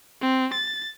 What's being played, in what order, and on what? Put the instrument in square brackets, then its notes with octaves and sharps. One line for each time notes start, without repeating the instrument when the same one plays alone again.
[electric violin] C4
A6